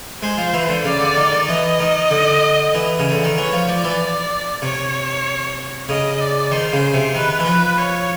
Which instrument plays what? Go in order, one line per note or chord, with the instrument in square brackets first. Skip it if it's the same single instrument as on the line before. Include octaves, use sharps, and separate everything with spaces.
[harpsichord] G#3 [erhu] C5
[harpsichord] F3
E3
D3
[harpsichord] C#3 [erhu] D5
[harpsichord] D3
D#3
D#3
[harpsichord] E3 [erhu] D#5
[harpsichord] D#3
D3
E3
C#3
D3
D#3
[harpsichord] E3 [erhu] C#5
[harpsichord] F3
[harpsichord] F3 [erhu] D5
[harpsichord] E3
[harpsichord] C3 [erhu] C#5
[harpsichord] C#3 [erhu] D#5
[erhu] D5
[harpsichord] D#3 [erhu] C5
[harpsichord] C#3
C3
[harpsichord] D#3 [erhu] B4
[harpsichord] E3
[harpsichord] F3 [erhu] B4
[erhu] C#5